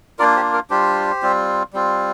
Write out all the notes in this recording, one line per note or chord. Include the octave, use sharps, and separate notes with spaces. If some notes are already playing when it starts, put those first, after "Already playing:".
A#3 D4 F4 A#4 D5
G4 C5
A#4
G3 D4 F4 G4 C5
G3 C4 F4
G3 C4 F4